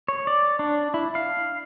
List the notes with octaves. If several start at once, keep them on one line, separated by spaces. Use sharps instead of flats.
C#5
D5
D4
E4
F5